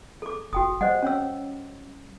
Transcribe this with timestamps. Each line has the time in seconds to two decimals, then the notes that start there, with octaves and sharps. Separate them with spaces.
0.22 A4 D6
0.53 F#1 F#4 G5 D#6
0.81 G3 C5 D#5 F#5
1.03 C#4 C#5 E6